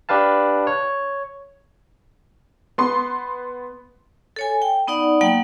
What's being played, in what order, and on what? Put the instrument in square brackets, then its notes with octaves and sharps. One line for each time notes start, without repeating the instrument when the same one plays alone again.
[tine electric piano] D4 G4 B4 F5 A5
C#5
[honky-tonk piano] B3 C6
[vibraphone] A4 C#5 G#5
G5
B3 D#4 D5 F#5
F#3 A#3 F#5 G5